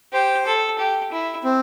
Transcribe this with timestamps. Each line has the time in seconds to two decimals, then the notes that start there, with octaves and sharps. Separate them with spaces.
0.13 G4 C5
0.46 A4
0.79 G4
1.12 E4
1.44 C4